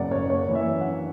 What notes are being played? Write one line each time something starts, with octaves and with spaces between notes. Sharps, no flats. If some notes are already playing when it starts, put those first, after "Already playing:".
Already playing: F#1 F#2 C#3 D5 F#5
F#1 C#5
A#3 C#5
E3
E5
F#2
F#5
D4